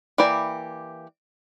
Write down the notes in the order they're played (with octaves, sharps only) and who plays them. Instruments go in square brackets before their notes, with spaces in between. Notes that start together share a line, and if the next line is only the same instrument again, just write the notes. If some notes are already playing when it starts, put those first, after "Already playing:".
[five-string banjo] E3 A#3 E4 G4 D5